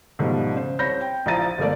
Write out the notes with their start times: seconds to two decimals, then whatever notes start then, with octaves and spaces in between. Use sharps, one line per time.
0.19 G#2 B2 D#3 F3 G3 A3
0.54 C#3 C5
0.79 C2 C5 C#5 B5 G6 A#6
1.01 G5
1.26 A#1 F3 E4 A#5 A6 D#7
1.58 G1 F3 G#3 A3 A#4 D5